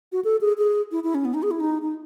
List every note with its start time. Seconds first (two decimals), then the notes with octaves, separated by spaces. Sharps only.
0.12 F#4
0.24 A4
0.41 G#4
0.58 G#4
0.92 E4
1.04 E4
1.15 C#4
1.25 B3
1.34 D#4
1.43 G#4
1.51 E4
1.60 D#4
1.82 D#4